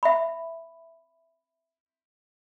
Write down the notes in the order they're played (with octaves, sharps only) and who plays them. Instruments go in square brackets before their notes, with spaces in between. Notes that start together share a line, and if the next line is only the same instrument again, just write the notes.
[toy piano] E5 B5